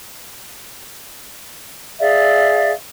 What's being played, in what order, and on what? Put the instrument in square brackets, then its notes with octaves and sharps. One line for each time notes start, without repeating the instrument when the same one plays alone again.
[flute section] G#4 D5 E5 F5